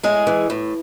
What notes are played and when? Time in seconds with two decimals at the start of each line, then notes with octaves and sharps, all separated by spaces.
0.03 A2 G#3 G#4
0.27 E3
0.50 A2